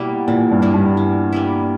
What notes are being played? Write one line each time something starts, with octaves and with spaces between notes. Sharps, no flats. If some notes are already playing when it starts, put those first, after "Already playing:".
Already playing: B2 G3 A#3 E4
A#2 E3
G2
G3 A#3 E4
G2
E3
G3 A#3 E4